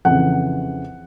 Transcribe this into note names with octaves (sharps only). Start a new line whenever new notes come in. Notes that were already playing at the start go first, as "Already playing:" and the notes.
F2 C#3 E3 F#5